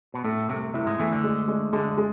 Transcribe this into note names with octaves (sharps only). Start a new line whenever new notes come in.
B2
A2 A3
C2 C3 A3
C2 C3 E4
G#2 G#3
E2 E3 A3
D2 D3
G#3
G#3
D2 D3 G#3
G#3